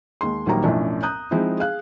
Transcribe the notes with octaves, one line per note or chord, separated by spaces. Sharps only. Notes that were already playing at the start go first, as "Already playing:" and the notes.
D#2 G#3 C6
A#1 D#3 F#3 G3 A#3 A#5
B1 F#2 A2 F3 C#4 D4
A#5 D#6 F#6 G6
F3 G#3 C4 D#4 E4
G#4 F5 F#6